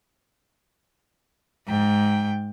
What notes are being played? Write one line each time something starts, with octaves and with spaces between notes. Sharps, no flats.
G#2 G5